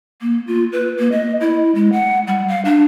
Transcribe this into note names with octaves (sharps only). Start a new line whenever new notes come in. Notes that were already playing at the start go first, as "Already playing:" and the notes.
A#3
F4
B4
A#3
D#5
E4
G#3
F#5
G3
F5
D4